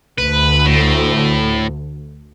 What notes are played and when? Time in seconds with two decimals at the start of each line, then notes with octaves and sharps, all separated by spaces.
0.18 D2 B4
0.66 A2